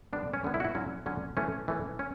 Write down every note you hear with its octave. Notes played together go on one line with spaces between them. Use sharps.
D3 G3 B3 D4
C#4
D3 G3 B3
E4
F#4
E4
D3 F#3 C#4
D3 F#3 C#4
E3 A3 C#4
E3 A3 C#4
C#4